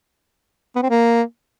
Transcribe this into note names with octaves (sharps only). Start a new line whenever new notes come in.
B3
C4
A#3